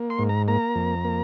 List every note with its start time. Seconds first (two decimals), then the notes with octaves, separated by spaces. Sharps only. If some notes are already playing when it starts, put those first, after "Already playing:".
Already playing: A#3
0.10 C6
0.19 G#2
0.29 A#5
0.48 A#3 A#5
0.75 F2
1.04 A#3